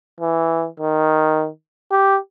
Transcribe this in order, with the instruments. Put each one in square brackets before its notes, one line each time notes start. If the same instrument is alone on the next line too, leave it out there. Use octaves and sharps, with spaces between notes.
[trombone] E3
D#3
G4